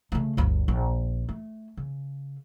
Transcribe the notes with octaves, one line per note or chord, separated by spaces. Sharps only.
C#3 A3
G1 D2
A#1
A3
C#3